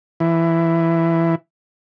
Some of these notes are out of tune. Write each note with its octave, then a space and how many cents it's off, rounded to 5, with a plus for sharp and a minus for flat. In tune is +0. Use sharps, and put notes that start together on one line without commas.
E3 +10